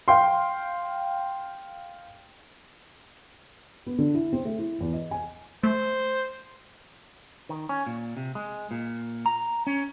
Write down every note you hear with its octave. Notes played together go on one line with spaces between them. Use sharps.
F5 G5 C6
B3
D3
E4
C4
A3
E4
E2
D#5
G#5
A3 C5
D#3
C#4
A#2
C3
G#3
A#2
A#5
C#4